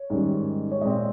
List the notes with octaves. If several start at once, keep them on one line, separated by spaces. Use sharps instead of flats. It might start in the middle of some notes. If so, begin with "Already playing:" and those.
Already playing: C#5
G#2 D#3 G3 C#4
C#5
A#2 G#3 C4 D#5